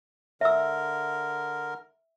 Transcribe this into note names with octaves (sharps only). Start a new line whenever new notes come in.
D3 A#4 E5 E6